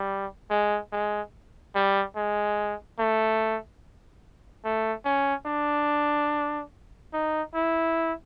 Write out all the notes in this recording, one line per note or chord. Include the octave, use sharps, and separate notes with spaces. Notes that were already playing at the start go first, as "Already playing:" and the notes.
Already playing: G3
G#3
G#3
G3
G#3
A3
A3
C#4
D4
D#4
E4